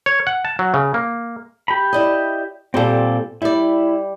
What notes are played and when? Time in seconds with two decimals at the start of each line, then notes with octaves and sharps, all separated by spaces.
0.06 C#5
0.27 F#5
0.45 A5
0.59 F#3
0.74 C#3
0.94 A#3
1.68 G4 B5
1.93 E4 D5 D#5
2.74 A#2 G3 C4 G4 A4
3.42 G3 E4 D5